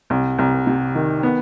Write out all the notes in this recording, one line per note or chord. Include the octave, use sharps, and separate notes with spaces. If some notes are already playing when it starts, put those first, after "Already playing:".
C2
C2
C3
D#3
B3